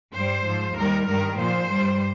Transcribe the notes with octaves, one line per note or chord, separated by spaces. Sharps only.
G2 G3 C5
G#2 F3
D#2 D#3 G3 A#4
G2 D#3 G3 A#4
A#2 F3 C5
G2 G3